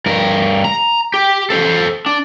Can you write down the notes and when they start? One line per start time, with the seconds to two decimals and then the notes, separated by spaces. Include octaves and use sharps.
0.06 G2 A#4
0.65 A#5
1.14 G4
1.50 A4 C5
2.06 D4